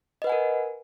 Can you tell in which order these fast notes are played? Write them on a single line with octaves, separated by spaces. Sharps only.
D#5 B4 F#5 G#5 A#4